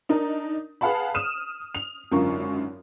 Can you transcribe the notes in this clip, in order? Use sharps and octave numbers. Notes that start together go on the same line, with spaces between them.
D4 D#4 A#4
G#4 B4 F5 F#5 A5 B5
D#6 F6 D#7 E7
F7
G#1 F#2 D3 F4 A#4 C#6